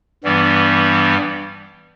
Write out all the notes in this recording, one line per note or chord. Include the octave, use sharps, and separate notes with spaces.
G2 E3 G3 B3